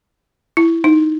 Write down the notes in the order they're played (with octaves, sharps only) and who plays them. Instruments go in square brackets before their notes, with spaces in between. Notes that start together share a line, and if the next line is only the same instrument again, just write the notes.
[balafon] E4
D#4